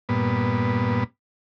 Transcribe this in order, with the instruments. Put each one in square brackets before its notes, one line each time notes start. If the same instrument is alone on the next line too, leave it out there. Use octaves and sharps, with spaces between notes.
[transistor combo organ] G2 A#2 B3